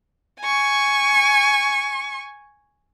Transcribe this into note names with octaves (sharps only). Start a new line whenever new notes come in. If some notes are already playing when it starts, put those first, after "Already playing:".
G#5 C#6